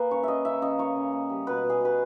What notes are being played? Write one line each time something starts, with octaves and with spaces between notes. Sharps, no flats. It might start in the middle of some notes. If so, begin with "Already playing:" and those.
Already playing: A#3 G#4 B4
C#3 C#5
C#3 D#5 E5
C#3 E5
C#3 D#5
A#3 C#5
C#3
A#3
G3
B2 B4
B2
G#4
B2 B4